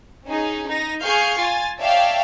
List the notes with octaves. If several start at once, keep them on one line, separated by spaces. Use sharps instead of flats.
C#4 D#4 G#4
D#4 A#6
G#4 F5 C#6 F6 G6 C7
F4 G#5 A6
C#5 D5 E5 F5 G5 A5